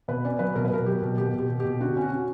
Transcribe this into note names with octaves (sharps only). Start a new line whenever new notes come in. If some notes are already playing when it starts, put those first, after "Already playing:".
B2 B4
C#4 D5
F#3 B4
B2 A#4
B4
B2 A#4
F#3 G4
B2
B2 G4
B2 G4
B2
G4
B2
D3 F#4
C#4
F#4
C#4